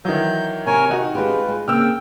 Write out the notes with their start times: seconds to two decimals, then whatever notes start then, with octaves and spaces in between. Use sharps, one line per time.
0.05 D#3 E3 F#3 G6
0.66 C3 A#4 C#5 G#5
0.90 D#3 D#4 F#4 D#5
1.15 G#3 C#4 F4 G4 B4
1.48 G#3
1.68 C#3 A#3 C4 G5 E6 F6